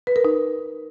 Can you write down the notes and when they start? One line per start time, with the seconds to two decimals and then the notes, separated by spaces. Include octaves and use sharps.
0.07 B4
0.16 A#4
0.25 D#4